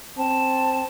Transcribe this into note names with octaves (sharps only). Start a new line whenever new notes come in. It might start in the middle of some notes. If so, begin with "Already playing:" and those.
C4 A5